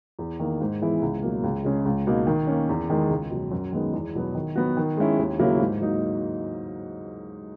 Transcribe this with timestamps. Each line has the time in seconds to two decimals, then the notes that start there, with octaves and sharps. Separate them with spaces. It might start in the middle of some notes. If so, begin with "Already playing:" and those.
0.19 E2
0.40 D#3 A#3
0.61 G#2
0.82 E3 B3 E4 G#4
1.02 C#2
1.22 B2 F#3 A#3
1.44 C#2
1.65 C#3 G#3 C#4 G#4
1.86 C#2
2.07 B2 A#3 D#4
2.27 D#3
2.47 A#3 C#4
2.69 E2
2.90 D#3 G#3
3.10 C#2
3.31 B2 F#3
3.52 F#2
3.72 D#3 G#3 B3 D#4
3.93 E2
4.15 B2 F#3 B3
4.35 D#3
4.56 F#3 B3 F#4
4.77 D#3
4.97 G#3 C#4 E4
5.19 D#2
5.39 C#3 F#3 A#3 E4
5.60 G#2
5.81 F#3 A#3 D#4